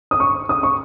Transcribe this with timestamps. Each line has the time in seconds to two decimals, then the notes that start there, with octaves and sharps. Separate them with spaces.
0.11 D#6
0.20 C#6
0.49 D#6
0.63 C#6